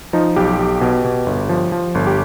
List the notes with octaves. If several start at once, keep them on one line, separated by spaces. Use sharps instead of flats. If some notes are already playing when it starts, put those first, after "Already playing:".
F3 D#4
B1 G4
B1
B2
B2
G1
F3
F3
G1
G4